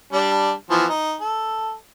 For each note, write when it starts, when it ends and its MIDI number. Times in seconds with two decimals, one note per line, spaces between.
0.13 0.52 55
0.13 0.52 62
0.70 0.86 52
0.70 0.86 53
0.70 0.86 59
0.89 1.15 63
1.21 1.74 69